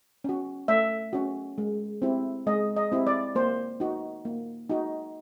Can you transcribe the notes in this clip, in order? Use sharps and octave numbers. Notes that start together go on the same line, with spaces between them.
C#4 F#4
A3 E5
C#4 F#4
G#3
C4 E4 G4
G#3 D#5
D#5
C4 E4 G4
D5
A#3 C5
D#4 F#4
A#3
D#4 F#4